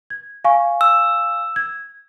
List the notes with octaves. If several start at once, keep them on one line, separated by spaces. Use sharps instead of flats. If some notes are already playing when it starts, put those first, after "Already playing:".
G#6
F5 G#5 C#6
E6
G#6